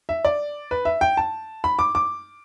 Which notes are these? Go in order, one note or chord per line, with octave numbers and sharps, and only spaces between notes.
E5
D5
B4
E5
G5
A5
B5
D6
D6